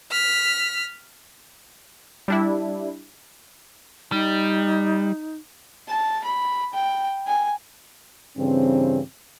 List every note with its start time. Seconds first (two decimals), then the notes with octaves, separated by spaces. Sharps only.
0.11 F6 B6
2.28 G3 D4 E4
4.12 G3 D#4
5.88 A5
6.24 B5
6.73 G5
7.27 G#5
8.38 G2 C#3 E3 C4